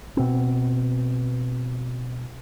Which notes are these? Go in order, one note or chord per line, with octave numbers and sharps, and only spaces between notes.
B2 C4